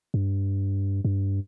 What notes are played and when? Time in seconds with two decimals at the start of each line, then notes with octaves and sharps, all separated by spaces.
0.14 G2
1.05 G2